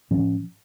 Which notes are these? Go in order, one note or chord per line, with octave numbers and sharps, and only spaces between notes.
A2 F3 C#4